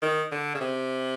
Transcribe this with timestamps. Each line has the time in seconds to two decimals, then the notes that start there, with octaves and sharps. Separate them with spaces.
0.02 D#3
0.31 D3
0.55 C#3
0.61 C3